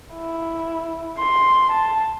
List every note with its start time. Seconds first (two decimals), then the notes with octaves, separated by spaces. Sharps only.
0.16 E4
1.19 C6
1.72 A5